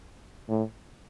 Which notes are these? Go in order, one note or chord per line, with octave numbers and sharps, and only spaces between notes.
A2